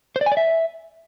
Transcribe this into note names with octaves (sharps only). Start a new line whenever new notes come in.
C5
D5
G#5
D5
E5